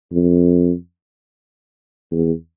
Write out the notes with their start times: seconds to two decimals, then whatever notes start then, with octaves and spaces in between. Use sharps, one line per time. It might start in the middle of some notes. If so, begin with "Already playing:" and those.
0.12 F2
2.11 E2